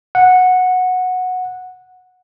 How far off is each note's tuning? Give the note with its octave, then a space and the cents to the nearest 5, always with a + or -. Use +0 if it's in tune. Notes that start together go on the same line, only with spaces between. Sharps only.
F#5 -10